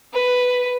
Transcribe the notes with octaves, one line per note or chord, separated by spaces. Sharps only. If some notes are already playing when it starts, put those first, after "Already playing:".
B4